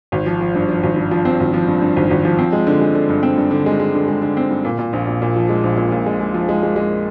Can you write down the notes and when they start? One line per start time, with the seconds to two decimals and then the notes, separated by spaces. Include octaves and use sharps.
0.12 G#1
0.26 F3
0.41 F3
0.55 G2
0.69 F3
0.83 G#1
0.96 G2
1.11 F3
1.25 C4
1.40 G#1
1.54 F3
1.68 G2
1.82 G2
1.96 G#1
2.11 G#1
2.25 F3
2.38 C4
2.53 G#3
2.67 D3
2.81 G#3
2.95 D3
3.09 G2
3.23 C4
3.37 G2
3.51 D3
3.66 G#3
3.79 G#3
3.94 D3
4.08 G#3
4.22 D3
4.37 C4
4.51 G2
4.65 A#2
4.79 A#2
4.93 A#1
5.07 A#2
5.22 A#2
5.36 F3
5.49 G#3
5.64 A#1
5.77 A#2
5.92 A#2
6.06 G#3
6.20 G#3
6.34 F3
6.49 G#3
6.63 G#3
6.76 G#3